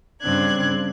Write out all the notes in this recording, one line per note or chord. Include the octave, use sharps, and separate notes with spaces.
G2 C#3 C4 D4 F#6 G#6